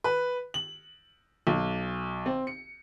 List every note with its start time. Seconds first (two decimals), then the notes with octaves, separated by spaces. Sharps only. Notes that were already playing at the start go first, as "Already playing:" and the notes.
0.04 B4
0.54 F#7
1.47 B1
2.26 C4
2.47 C#7